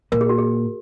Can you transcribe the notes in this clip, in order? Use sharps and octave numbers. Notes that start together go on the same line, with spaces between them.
A#2 A#4
G#4
F#4
G#4